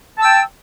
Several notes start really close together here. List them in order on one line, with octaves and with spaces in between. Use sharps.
A5 E6 G5